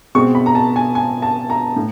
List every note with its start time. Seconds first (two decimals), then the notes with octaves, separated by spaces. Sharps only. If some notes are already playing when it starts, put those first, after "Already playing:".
0.15 B2 G#3 C4 C#6
0.35 B5
0.46 A#5
0.55 A5
0.76 G#5
0.95 G#5
1.22 A5
1.50 A#5
1.76 A2